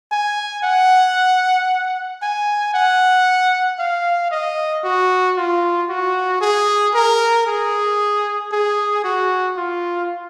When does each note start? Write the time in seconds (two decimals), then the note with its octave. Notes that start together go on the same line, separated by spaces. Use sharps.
0.12 G#5
0.64 F#5
2.22 G#5
2.74 F#5
3.79 F5
4.31 D#5
4.84 F#4
5.37 F4
5.89 F#4
6.41 G#4
6.94 A#4
7.46 G#4
8.52 G#4
9.04 F#4
9.56 F4